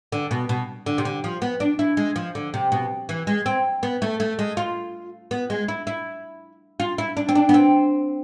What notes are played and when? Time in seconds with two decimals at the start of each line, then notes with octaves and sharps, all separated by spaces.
0.12 D3
0.31 B2
0.49 B2
0.86 D3
0.98 C3
1.05 D3
1.24 F3
1.42 B3
1.60 D4
1.79 E4
1.97 G#3
2.16 F3
2.35 D3
2.54 C3
2.72 B2
3.09 E3
3.27 G#3
3.46 C4
3.83 B3
4.02 A3
4.20 A3
4.39 G#3
4.57 F4
5.31 B3
5.50 G#3
5.68 E4
5.87 E4
6.80 F4
6.98 E4
7.17 D4
7.29 C4
7.35 D4
7.49 B3
7.54 C4